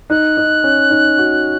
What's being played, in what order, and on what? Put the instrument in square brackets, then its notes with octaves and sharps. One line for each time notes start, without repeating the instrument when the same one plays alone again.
[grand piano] D#4 [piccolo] F#6
[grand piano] D#4
C#4
D#4
F#4